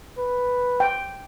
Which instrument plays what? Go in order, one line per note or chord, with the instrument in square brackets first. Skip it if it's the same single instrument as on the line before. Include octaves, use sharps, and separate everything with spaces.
[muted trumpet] B4
[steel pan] G5